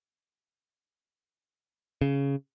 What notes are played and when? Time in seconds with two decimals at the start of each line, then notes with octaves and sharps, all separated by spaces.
2.01 C#3